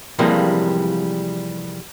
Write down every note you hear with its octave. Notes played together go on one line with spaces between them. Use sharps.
C3 E3 F3 G3 G#3 A#3